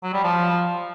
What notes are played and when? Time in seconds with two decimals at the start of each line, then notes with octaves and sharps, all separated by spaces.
0.03 F#3
0.13 G3
0.24 F3